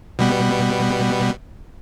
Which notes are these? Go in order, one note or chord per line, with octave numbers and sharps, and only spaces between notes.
B2 G3 B3